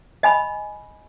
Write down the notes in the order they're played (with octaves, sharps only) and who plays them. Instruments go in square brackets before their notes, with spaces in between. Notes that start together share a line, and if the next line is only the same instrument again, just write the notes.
[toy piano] D#5 G#5 B5